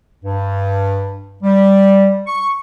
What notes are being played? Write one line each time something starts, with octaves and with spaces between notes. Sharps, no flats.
G2
G3
C#6